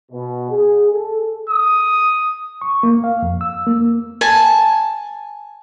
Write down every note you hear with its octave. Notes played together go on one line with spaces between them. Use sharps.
B2
G#4
A4
D#6
C#6
A#3
F5
F2
E6
A#3
G#5 A5